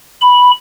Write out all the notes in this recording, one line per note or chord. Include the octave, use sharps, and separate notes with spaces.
B5